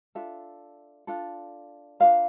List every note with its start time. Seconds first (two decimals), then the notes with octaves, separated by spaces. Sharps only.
0.15 D4 F4 A4 E5
1.07 D4 F4 A4
2.00 D4 F4 A#4 F5